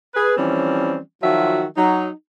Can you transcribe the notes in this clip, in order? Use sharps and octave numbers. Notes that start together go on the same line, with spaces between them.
G#4 B4
E3 F3 G3 C4 C#4
D#3 F3 F#3 F4 F#4 E5
F#3 D#4